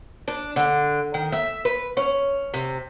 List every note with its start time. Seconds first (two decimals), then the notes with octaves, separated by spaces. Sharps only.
0.28 D4
0.56 D3
1.14 D#3
1.32 E5
1.65 B4
1.97 C#4
2.54 C3